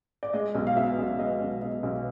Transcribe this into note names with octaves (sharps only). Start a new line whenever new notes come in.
D5
G#3 D#5
B1
F5
B2 E5
B1
G#3 D#5
B1
B2 D#5
B1